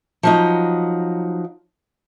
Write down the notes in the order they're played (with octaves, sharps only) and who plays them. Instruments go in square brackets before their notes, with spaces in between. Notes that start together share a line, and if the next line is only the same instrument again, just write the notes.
[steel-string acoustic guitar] F3 F#3 D#4